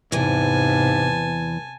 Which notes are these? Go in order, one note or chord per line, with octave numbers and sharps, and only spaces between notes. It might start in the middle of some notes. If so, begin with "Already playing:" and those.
E2 G#2 C3 E3 G#5 A5